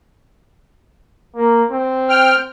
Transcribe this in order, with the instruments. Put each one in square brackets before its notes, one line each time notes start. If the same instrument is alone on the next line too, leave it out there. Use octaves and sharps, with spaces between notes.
[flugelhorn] A#3
C4
[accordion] G5 F6